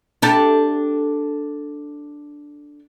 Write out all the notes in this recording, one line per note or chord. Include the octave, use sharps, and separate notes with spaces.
D4 G4 A4